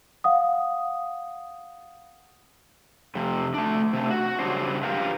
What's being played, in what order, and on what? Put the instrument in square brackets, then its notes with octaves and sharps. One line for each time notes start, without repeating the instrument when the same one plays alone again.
[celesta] F5 F#5 D#6
[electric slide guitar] F2 C3
A3 D4
C3 A3
F#4
C#3 F#3 G3 D4 C5
F4 G4 A#4 B4 F5